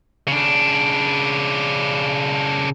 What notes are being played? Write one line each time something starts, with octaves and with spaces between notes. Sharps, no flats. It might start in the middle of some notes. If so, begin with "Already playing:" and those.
C#3 D4